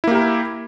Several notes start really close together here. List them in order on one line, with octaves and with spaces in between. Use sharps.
E4 A#3 G4 A#4